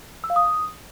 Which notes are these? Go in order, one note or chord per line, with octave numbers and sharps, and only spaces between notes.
E6
F5
D#6